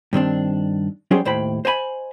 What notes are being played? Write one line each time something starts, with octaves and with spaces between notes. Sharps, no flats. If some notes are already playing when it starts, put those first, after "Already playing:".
G2 D#3 C4 D4
F#3 G3 C#4 G4 G#4 C5
D#2 A2 C5 G5 B5
C5 D#5 G#5 B5